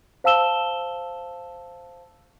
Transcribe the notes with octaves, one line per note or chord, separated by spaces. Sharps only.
C5 F5 A5 E6 E7 G7